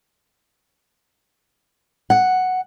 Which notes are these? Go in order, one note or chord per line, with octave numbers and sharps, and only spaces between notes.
F#5